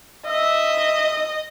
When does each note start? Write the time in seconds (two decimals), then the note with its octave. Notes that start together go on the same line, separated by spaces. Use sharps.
0.26 D#5 E5